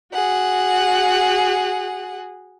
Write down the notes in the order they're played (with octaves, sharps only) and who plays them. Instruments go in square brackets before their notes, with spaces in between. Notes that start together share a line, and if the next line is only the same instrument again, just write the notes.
[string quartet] F#4 G#4 F#5